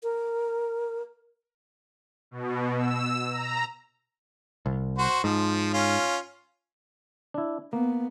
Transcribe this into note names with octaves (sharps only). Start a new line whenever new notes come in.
A#4
B2
E6
A#5
C2
F#4 C5
G#2 F3
C#4 F4
D4 E4
A#3 B3